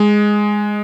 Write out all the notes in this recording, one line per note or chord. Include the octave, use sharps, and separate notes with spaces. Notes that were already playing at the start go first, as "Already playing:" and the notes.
Already playing: G#3